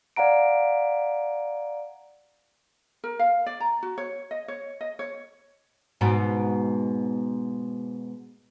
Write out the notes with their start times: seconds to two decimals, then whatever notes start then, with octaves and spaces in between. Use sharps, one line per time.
0.16 D5 F5 F#5 A#5 D7
3.04 A#4
3.19 F5
3.46 D5
3.60 A#5
3.83 F#4
3.98 C#5
4.31 D#5
4.48 C#5
4.81 D#5
4.99 C#5
6.01 G#2 B2 B3